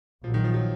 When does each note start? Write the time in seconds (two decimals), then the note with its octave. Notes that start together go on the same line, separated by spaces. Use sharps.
0.24 A#1 A#2 F3 F#3
0.34 D#3
0.44 F3
0.54 F#3